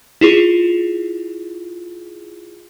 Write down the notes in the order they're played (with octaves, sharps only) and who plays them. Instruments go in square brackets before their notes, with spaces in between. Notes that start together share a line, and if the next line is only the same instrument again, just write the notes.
[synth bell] E4 F4 G#4